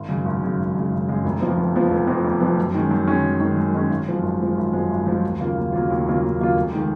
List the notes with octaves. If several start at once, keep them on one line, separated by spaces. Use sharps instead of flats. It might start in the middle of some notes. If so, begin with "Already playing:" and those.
Already playing: G#1
F#2 C#3 G#3
G#1
F#2 C#3 G#3
G#1
F#2 C#3 G#3
G#1
F#2 C#3 G#3
F1
F2 F3 B3
F1
F2 F3 B3
F1
F2 F3 B3
F1
F2 F3 B3
F#2
D#3 G#3 C#4
F#2
D#3 G#3 C#4
F#2
D#3 G#3 C#4
F#2
D#3 G#3 C#4
G#1
F#2 F3 G#3
G#1
F#2 F3 G#3
G#1
F#2 F3 G#3
G#1
F#2 F3 G#3
D#2
C#3 F#3 A#3 F4
D#2
C#3 F#3 A#3 F4
D#2
C#3 F#3 A#3 F4
D#2
C#3 F#3 A#3 F4
F1
D#3 G#3